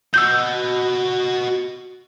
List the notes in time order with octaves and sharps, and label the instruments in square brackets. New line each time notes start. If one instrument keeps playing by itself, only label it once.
[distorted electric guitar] F#4 D#5 [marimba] E6 G6